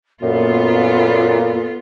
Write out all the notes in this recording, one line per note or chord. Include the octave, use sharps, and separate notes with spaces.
F#2 A#2 B3 F4 A4